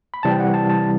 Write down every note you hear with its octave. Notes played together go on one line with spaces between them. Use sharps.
B5
C3 E3 G3 C4 E4 A5
G5
F#5
A5
A5